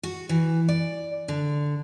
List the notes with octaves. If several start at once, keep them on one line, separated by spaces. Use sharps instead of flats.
F#4
E3
D5
D3